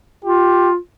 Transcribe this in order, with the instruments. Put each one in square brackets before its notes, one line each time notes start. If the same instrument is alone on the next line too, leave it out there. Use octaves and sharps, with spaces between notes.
[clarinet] F4 [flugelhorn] G4